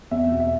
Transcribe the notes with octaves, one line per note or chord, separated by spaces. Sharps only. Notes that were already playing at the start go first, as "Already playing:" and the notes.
E2 E5
B2
E5